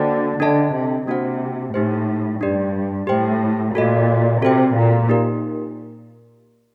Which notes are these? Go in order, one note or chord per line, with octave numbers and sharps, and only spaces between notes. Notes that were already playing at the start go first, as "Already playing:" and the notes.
Already playing: D3 A#3 F#4 A4 C5 G5
D3 D4 A4 D#5 A5
C3
C3 A#3 D4 F#4 C5 F#5
A2 D#4 G4 C5
G2 D4 G4 D5
A2 G4 C5 G5
A#2 F#4 A4 D#5
C3 F#4 A4 C5 G5
A#2
A#3 D#4 G4 A#4